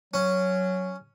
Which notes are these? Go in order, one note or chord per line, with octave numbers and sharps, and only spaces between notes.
F#3 C#4